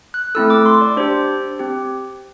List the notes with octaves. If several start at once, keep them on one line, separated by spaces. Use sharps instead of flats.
F#6
A3 C4 E4 A4 E6
D6
C6
D5
D4 G4 C5
C4 G4